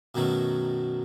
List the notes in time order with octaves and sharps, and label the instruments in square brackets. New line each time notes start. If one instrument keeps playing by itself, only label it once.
[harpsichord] F#2 B2 D#3 F#3 A3